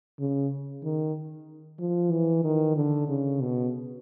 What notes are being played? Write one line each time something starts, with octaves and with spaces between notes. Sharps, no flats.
C#3
D#3
F3
E3
D#3
D3
C#3
B2